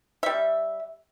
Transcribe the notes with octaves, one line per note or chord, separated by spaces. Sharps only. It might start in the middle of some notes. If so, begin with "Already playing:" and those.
G3 E5